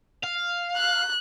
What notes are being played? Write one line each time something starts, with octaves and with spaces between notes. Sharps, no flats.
F5
F#6